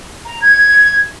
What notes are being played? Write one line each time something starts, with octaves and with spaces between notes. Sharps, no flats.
A#5
G#6